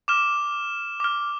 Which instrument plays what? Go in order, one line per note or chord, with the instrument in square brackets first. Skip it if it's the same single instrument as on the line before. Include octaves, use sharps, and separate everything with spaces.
[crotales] D6 F6 E7
D6 F6